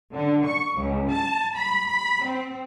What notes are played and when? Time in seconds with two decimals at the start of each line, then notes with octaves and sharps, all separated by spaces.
0.13 D3
0.45 C#6
0.76 C#2
1.10 A5
1.56 B5
1.88 B5
2.25 C4